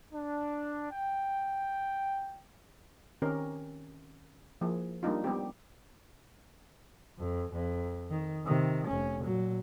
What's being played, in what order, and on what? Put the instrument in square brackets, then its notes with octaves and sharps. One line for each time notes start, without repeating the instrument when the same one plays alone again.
[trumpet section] D4
G5
[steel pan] D#3 C4 C#4 G4 A#4
F3 A#3 E4 G#4
G3 A#3 D4 D#4 F4
G3 B3 C4 G4
[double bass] F2
F2
D#3
C3 D#3
F1 C#4
A#2 F#3